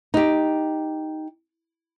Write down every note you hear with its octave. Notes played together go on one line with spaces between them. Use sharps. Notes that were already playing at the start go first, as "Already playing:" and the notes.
D#4 G4